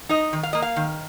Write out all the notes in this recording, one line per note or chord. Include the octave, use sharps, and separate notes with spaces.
D#4 D#5
D#3
F5
A#3 D#5
F5
D#3